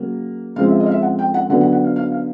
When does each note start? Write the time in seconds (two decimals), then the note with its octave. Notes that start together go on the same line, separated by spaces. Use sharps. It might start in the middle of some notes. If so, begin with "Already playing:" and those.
Already playing: C#3 F#3 A#3
0.56 C#3 F3 G#3 C4 F5
0.68 E5
0.80 D#5
0.86 F5
0.91 E5
1.02 F#5
1.19 G5
1.34 F#5
1.50 D3 F#3 B3 F#5
1.61 F#5
1.72 F#5
1.84 F5
1.96 F5
2.12 F5